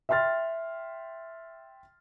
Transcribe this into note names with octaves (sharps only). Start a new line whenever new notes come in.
E5 G5 C6 F6 A6